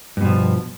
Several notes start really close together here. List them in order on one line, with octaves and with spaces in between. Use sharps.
G2 B2 F3